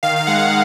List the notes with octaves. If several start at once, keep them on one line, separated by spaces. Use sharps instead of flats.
D#3 F5
F5
G#3 F#5
F5